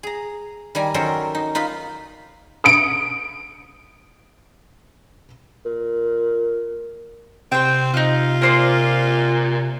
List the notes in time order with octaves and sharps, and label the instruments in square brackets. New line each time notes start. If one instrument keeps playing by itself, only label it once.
[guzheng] G#4 A#5
D#3 G3 G#5 A#5
D#3 F#3 C#4 A4 A#4 C5
D#4
D#4 F4 B4 B5
[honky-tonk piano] D#6 C#7 D7
[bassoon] A#2
[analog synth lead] C3 [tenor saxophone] C4 [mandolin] C5 G5
[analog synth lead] C3 [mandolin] D#4 F#6 [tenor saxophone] F4
[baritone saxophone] A#2 [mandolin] A#4 C5 D5